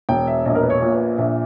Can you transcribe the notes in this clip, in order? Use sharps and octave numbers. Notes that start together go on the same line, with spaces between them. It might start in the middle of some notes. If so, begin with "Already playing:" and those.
E1 G5
E5
A#1 D#5
A#4
B4
C#5
A#2
B4
A#1 E5